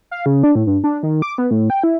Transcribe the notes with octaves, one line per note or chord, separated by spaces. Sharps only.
F5
C#3
D4
A2
G2
D4
D#3
D6
B3
A2
G5
E4